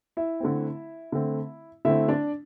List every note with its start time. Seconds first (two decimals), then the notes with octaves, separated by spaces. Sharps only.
0.17 E4 E5
0.40 D3 A3 C4
1.12 D3 A3 C4
1.85 D3 A3 C4 E4 E5
2.08 D4 D5